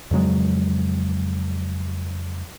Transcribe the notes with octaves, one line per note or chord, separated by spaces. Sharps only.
F2 C#3 F#3 G#3